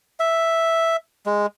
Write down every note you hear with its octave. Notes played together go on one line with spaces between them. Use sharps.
E5
G#3